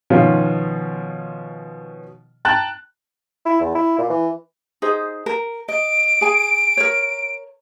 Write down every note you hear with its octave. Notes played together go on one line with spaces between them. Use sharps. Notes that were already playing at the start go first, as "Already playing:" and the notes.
B2 D#3 F3 C#4 F4
G5 A5 A#5 F#6 A6
E4
E2
E4
A#2
E3
D#4 G#4 C5
A#4
D#5 D7
G#4 G#5
A#4 C#5